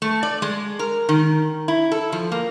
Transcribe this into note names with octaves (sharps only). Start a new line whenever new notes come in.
A3
D5
G#3
A#4
D#3
E4
A4
F3
A#3